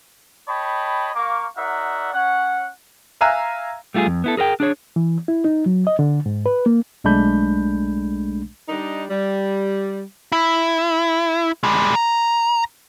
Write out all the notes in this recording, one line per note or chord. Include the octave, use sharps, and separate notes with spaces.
C#5 D#5 G5 A5 B5
A#3 A#4 F5 C#6 D6
D#4 F#4 A#4 D5 E5 F#5
C#4 F#5
E5 F5 G#5 A#5 E6 F#6
G3 A3 F4 F#4 G#4
F2
B3 E4 A4
G#4 A#4 C5 G5
D4 G#4 C#5
E3
E4
D#4
F#3
D#5
D3
G#2
B4
A#3
B1 G#3 A3 D4 B5 G6
G3 D4 D#4
G3
E4
G3 G#3
A#5